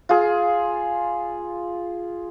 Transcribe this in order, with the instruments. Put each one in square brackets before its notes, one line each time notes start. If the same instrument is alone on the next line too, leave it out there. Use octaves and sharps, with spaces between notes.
[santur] F4 G#4